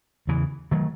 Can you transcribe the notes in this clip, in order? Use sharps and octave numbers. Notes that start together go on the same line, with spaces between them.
E2 C#3 E3
D#3 F#3 A3